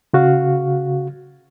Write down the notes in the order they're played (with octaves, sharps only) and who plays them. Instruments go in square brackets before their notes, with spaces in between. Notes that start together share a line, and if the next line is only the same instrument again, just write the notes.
[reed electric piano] C#3 F#4 F5